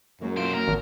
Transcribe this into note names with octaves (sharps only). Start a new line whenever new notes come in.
F#2 F#3 G#3 A#3
B1 F4 C5 D7
F#3 A#3 A#4
G#1